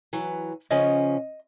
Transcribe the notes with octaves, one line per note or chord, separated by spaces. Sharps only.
E3 F#3
C#3 F3 C#4 D#5